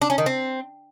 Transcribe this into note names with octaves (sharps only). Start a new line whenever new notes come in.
D4
C#4
D#3
C4